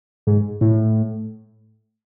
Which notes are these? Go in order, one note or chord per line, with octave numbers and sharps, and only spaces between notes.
G#2
A2